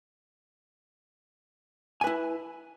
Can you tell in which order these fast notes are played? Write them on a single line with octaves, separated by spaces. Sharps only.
G#5 B4 E4